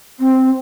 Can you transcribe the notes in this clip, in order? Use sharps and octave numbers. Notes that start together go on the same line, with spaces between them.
C4